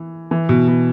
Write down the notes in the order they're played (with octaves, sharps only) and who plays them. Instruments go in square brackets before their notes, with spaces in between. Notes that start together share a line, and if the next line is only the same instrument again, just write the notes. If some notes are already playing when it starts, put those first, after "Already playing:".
Already playing: [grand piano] E3
E3
B2
B2